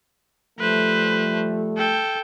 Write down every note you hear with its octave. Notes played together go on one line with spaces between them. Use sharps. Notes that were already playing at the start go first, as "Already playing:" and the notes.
F3 G3 A3 B4 C5
A4 G5